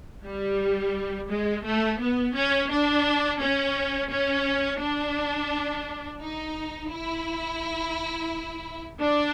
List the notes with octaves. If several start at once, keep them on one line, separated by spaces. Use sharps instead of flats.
G3
G#3
A3
B3
C#4
D4
C#4
C#4
D4
D#4
E4
D4